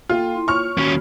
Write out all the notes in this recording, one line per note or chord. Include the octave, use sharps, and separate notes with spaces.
A#3 F4 A4 G5
E4 C6
A#3 F4 C#5 C#6 F6
C#5
D#2 C#4 F#4 B5